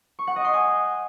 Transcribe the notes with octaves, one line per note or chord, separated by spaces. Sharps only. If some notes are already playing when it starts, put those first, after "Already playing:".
C#6
F#5
D#5
C6
G#5